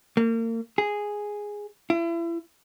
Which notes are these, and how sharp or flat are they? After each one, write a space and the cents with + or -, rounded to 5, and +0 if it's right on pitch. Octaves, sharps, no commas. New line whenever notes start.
A#3 -35
G#4 -5
E4 +35